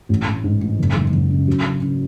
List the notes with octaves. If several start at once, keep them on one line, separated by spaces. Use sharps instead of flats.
A1
A1
G#2
A1
F#1
F#1
F#1
C#3
F#2
C#3
C#3